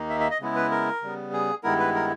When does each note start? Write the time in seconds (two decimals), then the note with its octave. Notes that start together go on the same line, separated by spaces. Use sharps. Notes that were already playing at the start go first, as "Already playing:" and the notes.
Already playing: D#2 D#3 A#3 D#4
0.10 E5
0.20 E5
0.31 D#5
0.40 C#3 G#3 B3 E4
0.56 B4
0.71 A#4
1.02 C#3 G3 B3
1.33 G#4
1.63 G2 D#3 G#3 B3 E4 A#4
1.79 B4
1.95 A#4